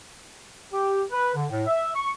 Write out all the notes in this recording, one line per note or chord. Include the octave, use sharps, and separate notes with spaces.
G4
B4
D3
A2
E5
C#6